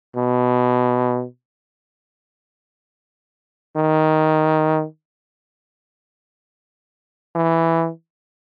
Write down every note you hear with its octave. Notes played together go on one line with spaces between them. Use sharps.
B2
D#3
E3